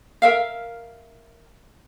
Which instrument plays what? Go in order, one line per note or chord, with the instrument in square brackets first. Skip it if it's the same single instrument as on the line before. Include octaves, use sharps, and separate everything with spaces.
[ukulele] A#4 E5 F5